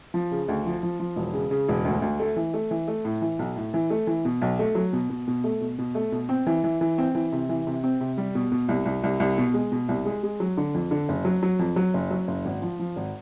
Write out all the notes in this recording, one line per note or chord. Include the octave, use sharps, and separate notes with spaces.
F3
C#3
D2
F3
F3
F3
E1
C#3
C#3
E1
D2
D2
A3
E3
A3
E3
A3
A2
E3
B1
A2
E3
A3
E3
B2
B1
A3
F#3
B2
B2
B2
A3
B2
B2
A3
B2
C4
E3
E3
E3
C4
E3
C3
E3
C3
C4
C3
G3
B2
B2
C2
C2
C2
C2
B2
G#3
B2
C2
G#3
G#3
F#3
D3
F2
D3
F#1
F#3
F#3
F2
F#3
F#1
F#3
F#1
G#1
F3
F3
G#1